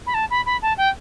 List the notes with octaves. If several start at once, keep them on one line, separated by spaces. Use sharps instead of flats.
B5
A5
B5
B5
A5
G5